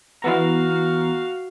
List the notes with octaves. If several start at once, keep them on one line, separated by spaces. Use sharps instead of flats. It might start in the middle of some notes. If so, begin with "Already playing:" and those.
E3 B3 F#4 F5 A#5